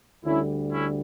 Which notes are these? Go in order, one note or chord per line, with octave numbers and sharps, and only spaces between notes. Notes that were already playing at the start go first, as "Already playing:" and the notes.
D2 D3 G3 C#4 E4
C#4 E4